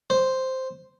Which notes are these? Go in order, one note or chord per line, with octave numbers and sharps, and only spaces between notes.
C5